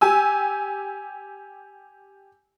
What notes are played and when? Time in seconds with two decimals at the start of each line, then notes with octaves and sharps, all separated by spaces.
0.01 G4 G#5 E6